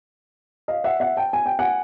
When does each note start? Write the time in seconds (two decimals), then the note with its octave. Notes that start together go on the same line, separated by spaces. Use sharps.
0.68 D#5 F5
0.84 E5 F#5
1.00 E5 F#5
1.17 G5 A5
1.33 G#5
1.46 G5
1.59 F#5 G#5